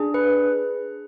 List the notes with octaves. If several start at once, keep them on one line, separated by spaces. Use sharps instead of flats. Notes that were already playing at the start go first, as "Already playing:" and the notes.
Already playing: D4 G#4
B4